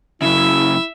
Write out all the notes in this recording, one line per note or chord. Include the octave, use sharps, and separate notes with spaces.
F#2 C#3 E4 E5